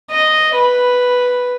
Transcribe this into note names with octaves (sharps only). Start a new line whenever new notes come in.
D#5
B4